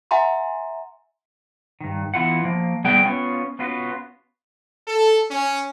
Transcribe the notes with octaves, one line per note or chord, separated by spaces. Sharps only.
E5 F#5 G#5 A#5 C6
G2 D#3
E3 B3 E4 F4 F#5
F3 A#3
G3 B3 G#4 B4 G5
B3 C#4 F4
B3 C#4 F4 F#4 B4
A4
C#4